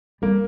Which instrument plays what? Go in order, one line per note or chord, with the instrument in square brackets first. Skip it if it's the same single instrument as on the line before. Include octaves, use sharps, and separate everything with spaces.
[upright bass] G3 [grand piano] A#3